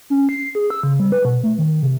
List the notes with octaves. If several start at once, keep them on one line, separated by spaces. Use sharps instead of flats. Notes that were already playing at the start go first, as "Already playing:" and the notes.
C#4
C7
G#4
E6
C#3
G3
B4
B2
A3
D#3
C3